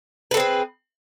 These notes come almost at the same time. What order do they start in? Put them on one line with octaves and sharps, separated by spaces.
B4 A4 C4 G#4